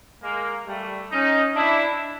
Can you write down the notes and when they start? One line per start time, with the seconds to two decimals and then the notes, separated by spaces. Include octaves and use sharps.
0.23 G#3 A#3
0.67 G3 A3
1.11 C#4 D#4
1.56 D4 E4